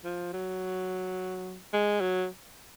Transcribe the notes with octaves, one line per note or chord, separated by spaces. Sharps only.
F3
F#3
G#3
F#3